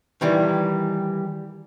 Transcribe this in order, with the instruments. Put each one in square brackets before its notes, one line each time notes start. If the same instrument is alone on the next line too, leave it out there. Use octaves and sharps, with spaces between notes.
[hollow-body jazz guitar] D#3 E3 G3